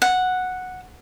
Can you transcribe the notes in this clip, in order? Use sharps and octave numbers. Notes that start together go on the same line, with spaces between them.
F#5